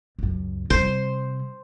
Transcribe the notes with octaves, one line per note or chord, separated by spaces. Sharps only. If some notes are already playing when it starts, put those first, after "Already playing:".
C#2 F#2
C3 G3 C5